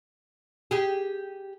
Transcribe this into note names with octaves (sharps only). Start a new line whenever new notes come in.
G4 G#4